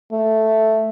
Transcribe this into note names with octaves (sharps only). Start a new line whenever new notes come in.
A3